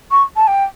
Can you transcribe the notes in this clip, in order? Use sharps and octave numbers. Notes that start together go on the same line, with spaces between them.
C#6
A5
G5